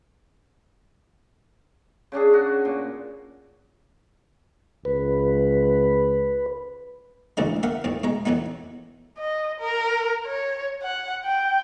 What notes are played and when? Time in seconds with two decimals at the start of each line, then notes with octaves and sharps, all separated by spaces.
2.12 C#3 C#4 D4 G#4
2.33 F#4
2.65 A#2
4.85 C#2 B4
7.37 D2 A2 D3 E3 F3 G#3
7.63 A#3 A#4 E5 F#5
7.84 B1 F2 A2
8.04 B2 G#3 A#5
8.25 F2 E3 F#3 B3 D#4
9.19 D#5
9.60 A#4
10.27 C#5
10.82 F#5
11.25 G5